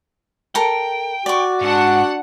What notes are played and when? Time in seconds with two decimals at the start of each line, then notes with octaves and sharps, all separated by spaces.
0.55 A4 A#4 G5
1.26 F#4 D5 C#6
1.62 G#2 D4 F#5